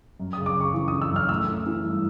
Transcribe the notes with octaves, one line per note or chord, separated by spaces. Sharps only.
F#2
C#3 D#6
D6
C#3
C#6
E3
D#6
E3
E6
F#2 F6
A3 E6
E3
E3
G2